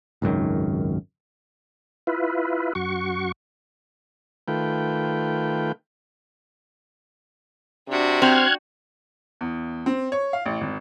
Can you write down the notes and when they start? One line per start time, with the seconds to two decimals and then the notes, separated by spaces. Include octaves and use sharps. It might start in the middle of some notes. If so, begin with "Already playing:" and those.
0.22 G#1 C#2 F#2 D#3
2.07 E4 F4 B4
2.75 F#2 F#4 C#6
4.48 D#3 A3 F4 B4 G5
7.88 C3 D4 F#4
8.22 C4 F6 F#6 G#6
9.41 E2
9.86 C4
10.12 C#5
10.33 F5
10.46 A1
10.61 G#1